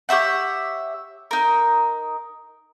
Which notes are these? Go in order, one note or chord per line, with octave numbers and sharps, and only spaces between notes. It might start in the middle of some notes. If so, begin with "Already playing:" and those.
G4 C#5 E5 F#5
D#4 A#4